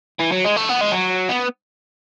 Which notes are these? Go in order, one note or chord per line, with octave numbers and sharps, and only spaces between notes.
E3
F#3
G#3
A3
B3
G#3
F#3
B3